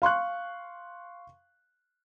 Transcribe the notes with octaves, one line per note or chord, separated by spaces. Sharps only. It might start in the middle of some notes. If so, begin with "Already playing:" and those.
F5 C6 C#6 F#6